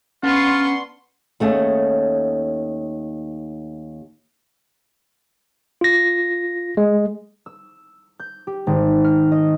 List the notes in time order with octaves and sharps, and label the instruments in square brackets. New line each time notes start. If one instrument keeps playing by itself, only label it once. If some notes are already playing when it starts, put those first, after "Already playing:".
[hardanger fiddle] B3 C#6 [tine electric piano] C#4 [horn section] D4 F#5 C6 [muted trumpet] F4
[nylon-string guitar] D#2 A3 C#4 G#4
[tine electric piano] F4 A#6
G#3
[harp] E6
G6
G4
G#1
F6
D#5